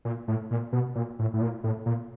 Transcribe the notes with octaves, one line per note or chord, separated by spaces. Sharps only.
A#2
A2
A#2
B2
A#2
A2
A2
A#2
A2
A#2